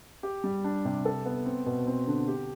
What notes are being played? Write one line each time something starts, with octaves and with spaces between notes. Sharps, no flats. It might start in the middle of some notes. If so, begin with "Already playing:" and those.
G4
G3
D4
C3
A4
B3
C4
B2
C4
D3
G4